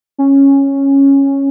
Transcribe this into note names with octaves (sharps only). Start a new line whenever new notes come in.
C#4